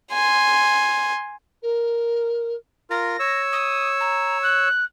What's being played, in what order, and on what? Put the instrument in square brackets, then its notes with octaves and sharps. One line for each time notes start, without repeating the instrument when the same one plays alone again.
[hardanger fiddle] G#5 C6
[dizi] A#4
[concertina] F4 A#4 [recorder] A#6
[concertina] C#5 E6
[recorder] D#6
A#5
F#6